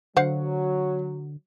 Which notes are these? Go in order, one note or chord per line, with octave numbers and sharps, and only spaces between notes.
D3 F#3 C5 F5 F#5